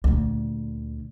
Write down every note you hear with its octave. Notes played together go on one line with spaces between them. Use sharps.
D2 A#2